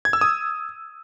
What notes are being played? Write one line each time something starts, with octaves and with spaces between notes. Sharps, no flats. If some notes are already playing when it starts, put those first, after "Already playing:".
G#6
E6
D#6